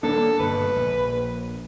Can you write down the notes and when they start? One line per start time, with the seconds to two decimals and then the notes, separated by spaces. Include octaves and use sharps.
0.03 D#1 A#3 D4 A4
0.39 G1 B2 B4
0.76 A#1